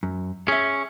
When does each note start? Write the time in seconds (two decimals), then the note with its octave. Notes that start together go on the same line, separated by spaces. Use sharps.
0.03 F#2
0.48 C#4 G#4 E5